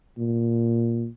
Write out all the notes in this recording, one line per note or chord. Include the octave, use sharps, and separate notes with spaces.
A#2